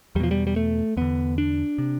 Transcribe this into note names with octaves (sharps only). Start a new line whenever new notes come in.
E2 B2 F3 G3
G3
G3
A3
E2 D3 B3
D4
C3